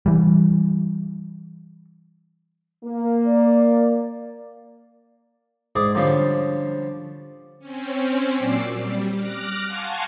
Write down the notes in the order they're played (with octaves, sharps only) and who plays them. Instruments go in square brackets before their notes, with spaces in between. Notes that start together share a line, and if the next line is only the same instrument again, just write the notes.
[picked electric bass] E3 G3
[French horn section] A#3
[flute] D5
[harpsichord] G#2 G#4 D5
D3 F3 G3 C#4 D4 F5
[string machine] C4 C#4
A#2 F#3 D5 D6 E6 C7
G3
D6 F6 F#6 A#6
F5 F#5 G#5 A5 C6 C#6